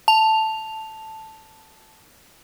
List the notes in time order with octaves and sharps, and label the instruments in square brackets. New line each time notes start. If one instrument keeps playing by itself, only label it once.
[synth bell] A5 F7